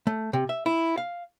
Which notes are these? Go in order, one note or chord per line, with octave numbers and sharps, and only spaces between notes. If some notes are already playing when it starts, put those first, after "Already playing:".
A3
C3
E5
E4
F5